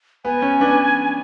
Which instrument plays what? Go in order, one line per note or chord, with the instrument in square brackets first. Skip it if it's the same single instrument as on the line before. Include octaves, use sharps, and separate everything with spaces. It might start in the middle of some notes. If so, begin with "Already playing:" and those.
[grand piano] B3 [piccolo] G#5
[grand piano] C#4
B3 D4